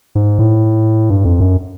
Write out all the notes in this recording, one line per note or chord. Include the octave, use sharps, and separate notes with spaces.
G#2
A2
G2
F2
F#2